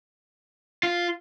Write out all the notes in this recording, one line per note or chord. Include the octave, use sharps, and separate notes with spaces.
F4